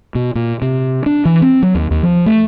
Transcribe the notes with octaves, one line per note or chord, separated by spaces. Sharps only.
B2
A#2
C3
D4
E3
C4
F#3
D#2
D#2
F3
A3